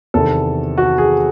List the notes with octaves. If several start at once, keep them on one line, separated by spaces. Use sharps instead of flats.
E2 C3 D#3 A4
F#4
G#4